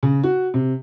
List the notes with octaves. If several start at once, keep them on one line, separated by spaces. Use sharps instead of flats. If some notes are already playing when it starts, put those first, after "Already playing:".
C#3
F#4
C3